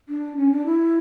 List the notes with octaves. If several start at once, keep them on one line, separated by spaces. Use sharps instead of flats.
D4
C#4
D4
E4